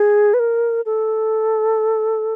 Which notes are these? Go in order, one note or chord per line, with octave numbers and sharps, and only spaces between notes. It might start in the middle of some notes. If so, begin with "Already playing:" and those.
Already playing: G#4
B4
A#4
A4